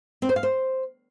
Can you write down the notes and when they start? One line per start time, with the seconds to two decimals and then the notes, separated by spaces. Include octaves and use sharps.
0.22 C4
0.29 C5
0.36 F5
0.43 C5